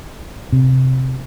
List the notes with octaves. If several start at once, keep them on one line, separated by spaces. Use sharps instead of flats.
C3